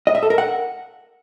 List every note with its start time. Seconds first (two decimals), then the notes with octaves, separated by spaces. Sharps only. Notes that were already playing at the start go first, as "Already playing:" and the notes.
0.07 D#5
0.15 E5
0.23 A4
0.30 A#4
0.38 F#5